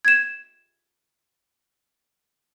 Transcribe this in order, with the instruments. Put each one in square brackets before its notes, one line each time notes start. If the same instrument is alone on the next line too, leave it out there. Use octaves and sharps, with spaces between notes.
[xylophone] G#6 E7